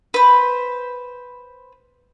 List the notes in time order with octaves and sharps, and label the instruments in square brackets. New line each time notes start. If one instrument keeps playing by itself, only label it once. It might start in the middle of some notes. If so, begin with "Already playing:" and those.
[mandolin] B4 C5